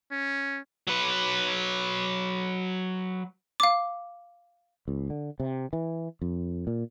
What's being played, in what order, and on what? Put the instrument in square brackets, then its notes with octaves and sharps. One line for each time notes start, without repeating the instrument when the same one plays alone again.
[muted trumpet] C#4
[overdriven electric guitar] F#3 B4
[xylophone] F5 D6
[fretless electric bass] C#2
D3
C3
E3
F2
A#2